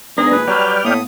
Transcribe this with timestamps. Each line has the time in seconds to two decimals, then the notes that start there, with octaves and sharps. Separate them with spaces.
0.18 D#3 G#3 B3 C4 D4 G#4 A#5
0.32 D#2 A#2 G#3 B4
0.48 F#3 G3 D5 G5 B5 F6
0.85 A2 A#3 B3 D#6